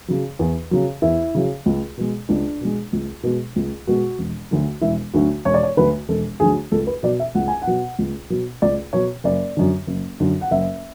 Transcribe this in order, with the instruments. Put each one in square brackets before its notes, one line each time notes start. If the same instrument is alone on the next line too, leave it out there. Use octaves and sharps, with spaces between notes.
[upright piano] C#3 F#3
E2
C#3 F#3
E2 E4
C#3 F#3
C#2
B2 G#3
C#2 D4
B2 G#3
C#2
B2 G#3
C#2
B2 G#3 F#4
E1
D2 D3 F#3
E1 E4
D2 D3 F#3 F#4
E1 C#5
D5
C#5
D2 D3 F#3 B4
E1 A4
D2 D3 F#3 G#4
C#2 A4
B4
B2 F#3 D5
E5
C#2 F#5
G#5
F#5
B2 F#3
C#2
B2 F#3
C#2 D5
B2 F#3 C#5
F#1 D5
F#2 D3
F#1
F#2 D3
F#5
F#1 E5